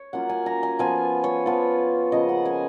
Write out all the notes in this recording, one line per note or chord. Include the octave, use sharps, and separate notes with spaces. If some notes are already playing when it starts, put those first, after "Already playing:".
Already playing: C#5
F#3 A#3 C#4 F4 F#5
G#5
A#5
G#5
F3 B3 F4 G#5
C#5
F3 B3 F4
C#3 F3 A#3 D#5
F#5
G#5